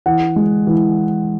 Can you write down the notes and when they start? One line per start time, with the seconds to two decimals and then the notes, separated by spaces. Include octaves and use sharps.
0.06 E3 F#5
0.36 G#3
0.67 E3